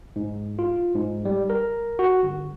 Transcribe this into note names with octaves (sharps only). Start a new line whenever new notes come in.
G#2
F4
G#2
G3
A#4
F#4
G1